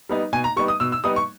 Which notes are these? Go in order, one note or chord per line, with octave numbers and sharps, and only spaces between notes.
G3 B3 D#4
B2 G#5
A#5
G3 B3 D#4 C#6
D#6
B2 E6
E6
G3 B3 D#4 D#6
C#6